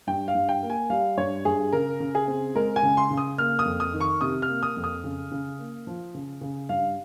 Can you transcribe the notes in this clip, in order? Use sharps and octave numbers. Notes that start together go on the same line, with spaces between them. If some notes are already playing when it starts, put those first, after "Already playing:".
G2 G5
F5
G2
G5
A#3
G#5
G3 F5
G2 C#5
G2 G#4
C#3 A#4
C#3
G#4
C4
G#3 A#4
G#5
C#3
C6
C#3
D#6
A#3 F6
D#6
F2
D#6
D#3
C#6
C3 D#6
F6
A#3
D#6
F2
D#6
C#3
C#3
A#3
F3
C#3
C#3
G2 F5